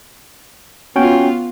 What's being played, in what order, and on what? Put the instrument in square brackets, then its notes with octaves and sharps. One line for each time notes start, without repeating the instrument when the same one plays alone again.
[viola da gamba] B3 F4 [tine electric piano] C#4 F#4 G5